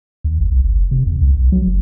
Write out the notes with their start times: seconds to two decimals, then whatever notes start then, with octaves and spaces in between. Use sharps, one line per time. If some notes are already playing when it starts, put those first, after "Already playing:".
0.24 D#2
0.40 G1
0.52 B1
0.65 G1
0.79 F1
0.91 C3
1.07 E2
1.21 C#2
1.37 B1
1.52 F#3
1.67 F#1